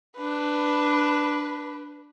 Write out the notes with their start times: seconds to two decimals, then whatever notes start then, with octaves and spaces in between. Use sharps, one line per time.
0.16 D4 B4